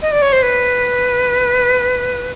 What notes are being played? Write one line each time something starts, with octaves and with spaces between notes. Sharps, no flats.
D#5
D5
C#5
C5
B4